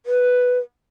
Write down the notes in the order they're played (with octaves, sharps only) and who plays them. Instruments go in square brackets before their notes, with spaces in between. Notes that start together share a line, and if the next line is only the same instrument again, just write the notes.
[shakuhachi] B4